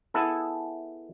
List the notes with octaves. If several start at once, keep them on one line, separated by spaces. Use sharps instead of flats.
B3 E4 G#4 A4